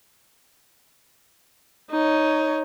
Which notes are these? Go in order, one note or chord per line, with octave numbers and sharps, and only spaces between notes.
D#4 C#5